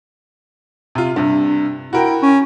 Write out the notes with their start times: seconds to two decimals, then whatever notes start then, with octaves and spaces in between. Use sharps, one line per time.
0.95 C3 F4
1.16 G2 C3
1.93 E4 F#4 A#4 G5
2.22 C#4